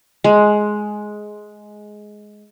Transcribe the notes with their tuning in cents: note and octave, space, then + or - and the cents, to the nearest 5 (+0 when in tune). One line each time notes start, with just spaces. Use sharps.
G#3 +10